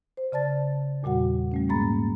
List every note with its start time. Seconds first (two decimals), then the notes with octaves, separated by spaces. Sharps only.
0.17 C5
0.32 C#3 D5 A5 A6
1.03 E2 A#2 G3 F#4 F#5
1.52 G3 A3 C#4
1.69 G#2 G#3 A#3 A#5 B5 A6